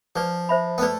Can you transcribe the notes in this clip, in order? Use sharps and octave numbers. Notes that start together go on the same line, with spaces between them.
F3 G#4 B4 D5
C5 E5 B5
B3
A3 G#4 B4 D5